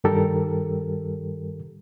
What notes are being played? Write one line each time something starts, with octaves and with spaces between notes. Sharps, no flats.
G2 D#3 G3 G4 A4 A#4